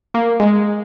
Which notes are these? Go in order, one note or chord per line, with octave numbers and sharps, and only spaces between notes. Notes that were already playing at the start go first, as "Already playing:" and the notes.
A#3
G#3